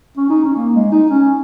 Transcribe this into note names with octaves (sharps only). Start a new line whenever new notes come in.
C#4
D#4
C#4
A#3
G#3
D#4
C#4